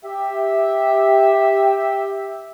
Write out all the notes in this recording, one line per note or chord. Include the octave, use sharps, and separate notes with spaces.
G4 E5